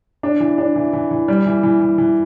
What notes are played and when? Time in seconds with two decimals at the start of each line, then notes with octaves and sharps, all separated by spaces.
0.23 D4
0.40 E3
0.58 D4
0.76 E3
0.93 E3
1.11 E3
1.28 G3
1.46 E3
1.63 E3
1.81 E3
1.98 E3